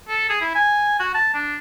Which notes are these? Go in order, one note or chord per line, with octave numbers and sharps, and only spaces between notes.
A4
G#4
E4
G#5
F#4
A5
D4